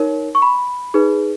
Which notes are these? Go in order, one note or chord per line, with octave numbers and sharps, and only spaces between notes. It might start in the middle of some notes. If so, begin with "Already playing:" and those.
Already playing: D#4 A#4 C#5
C#6
B5
D#4 G#4 B4